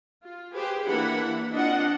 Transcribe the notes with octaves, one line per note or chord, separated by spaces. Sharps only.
F4
G4 G#4 B4 C5
E3 A#3 D4 E4 F#5 B5
C4 D4 F4 D#5 F#5